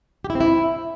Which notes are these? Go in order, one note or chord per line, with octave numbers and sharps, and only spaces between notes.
G4
E4
C4
E4